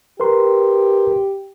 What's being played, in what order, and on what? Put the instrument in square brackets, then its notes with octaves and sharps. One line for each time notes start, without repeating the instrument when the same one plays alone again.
[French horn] G4 [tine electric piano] A#4 B4 C6